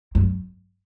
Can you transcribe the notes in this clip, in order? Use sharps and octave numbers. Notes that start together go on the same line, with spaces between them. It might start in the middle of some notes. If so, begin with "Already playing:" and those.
F#2